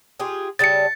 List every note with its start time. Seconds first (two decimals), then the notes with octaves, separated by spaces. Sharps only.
0.20 F4 G4 G#4
0.59 C#3 G3 A3 A6 C#7